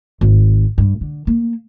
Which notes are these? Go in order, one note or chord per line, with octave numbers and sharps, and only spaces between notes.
G#1
G2
D3
A#3